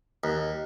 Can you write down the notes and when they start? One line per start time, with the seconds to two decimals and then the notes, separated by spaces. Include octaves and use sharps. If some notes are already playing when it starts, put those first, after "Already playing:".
0.24 D#2